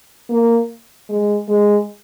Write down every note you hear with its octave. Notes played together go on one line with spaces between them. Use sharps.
A#3
G#3
G#3